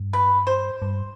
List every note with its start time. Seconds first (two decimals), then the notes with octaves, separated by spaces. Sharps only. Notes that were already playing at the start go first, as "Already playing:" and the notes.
Already playing: G2
0.13 B4
0.47 C5
0.82 G2